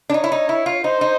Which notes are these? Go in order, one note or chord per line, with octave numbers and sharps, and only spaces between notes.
D4
D#4 C#5
E4
D#4
E4
F4
D#4 C5
D#4